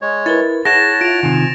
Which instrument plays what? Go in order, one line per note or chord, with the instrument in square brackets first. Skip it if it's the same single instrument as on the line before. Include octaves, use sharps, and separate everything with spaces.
[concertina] G#3 C#5
[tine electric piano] E4 A#4 B4 [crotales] A6
[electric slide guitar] E4 [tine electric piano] G#4 A6 [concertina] C#5 F#5 A5 [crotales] A#6 E7
[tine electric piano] F4 [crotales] D7 F7
[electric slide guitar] C3 D#3 [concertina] G#5